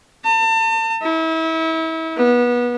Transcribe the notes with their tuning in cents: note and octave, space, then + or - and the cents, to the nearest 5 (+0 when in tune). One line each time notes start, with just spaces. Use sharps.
A5 +40
E4 -35
B3 -25